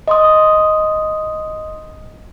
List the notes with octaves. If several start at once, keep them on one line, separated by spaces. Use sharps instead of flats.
D#5 C6 D#6